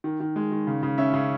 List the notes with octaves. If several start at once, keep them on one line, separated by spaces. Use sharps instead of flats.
D#3
D#3
G#3
D#3
C#3
C#3
C#4 E5
C#3